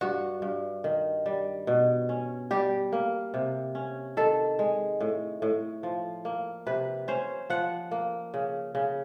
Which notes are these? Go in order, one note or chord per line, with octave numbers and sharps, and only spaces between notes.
G2 F#4
G2
D#3
G3
B2
C#4
G3 G4
A#3
C3
C#4
D#3 A4
G#3
A2
A2
F3
A#3
C3 B4
C#4 C5
F3 F#5
A#3
C#3
C#3